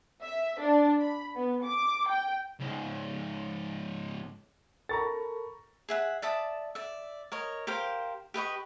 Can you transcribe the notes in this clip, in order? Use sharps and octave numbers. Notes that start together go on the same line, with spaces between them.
E5
D4
B5
B3
D6
G5
C#2 G#2
A4 A#4 A#5 B5 C#6 A6
G#4 E5 F#5
D5 E5 A5 D#6
D5 E5
A#4 C#5 D#5
G4 A#4 C5 F5
G4 B4 D#5 C#6